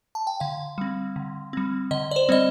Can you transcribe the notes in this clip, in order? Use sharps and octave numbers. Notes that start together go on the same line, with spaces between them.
A5
G5
D3 F5
G3 C4
D3
G3 C4
D3 D#5
D5
C5
G3 C4 D#5